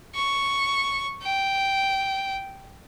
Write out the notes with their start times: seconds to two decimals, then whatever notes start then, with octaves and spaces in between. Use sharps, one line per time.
0.15 C#6
1.23 G5